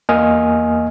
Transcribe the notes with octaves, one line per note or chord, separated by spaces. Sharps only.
E2 A#3 D#5 G#5 D#6 F6